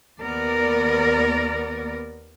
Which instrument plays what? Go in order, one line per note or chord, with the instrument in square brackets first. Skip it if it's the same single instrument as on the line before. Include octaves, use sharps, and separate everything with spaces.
[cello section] D#2 B3 A#4 D5